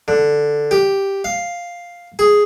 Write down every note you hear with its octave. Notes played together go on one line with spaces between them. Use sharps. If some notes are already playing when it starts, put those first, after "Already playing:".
D3
G4
F5
G#4